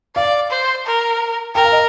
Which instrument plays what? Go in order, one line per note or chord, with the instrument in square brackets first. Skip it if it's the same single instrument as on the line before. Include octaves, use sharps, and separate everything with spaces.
[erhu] D5 [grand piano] F5
[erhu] C5
A#4
[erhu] A#4 [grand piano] G5
[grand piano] F5
D#5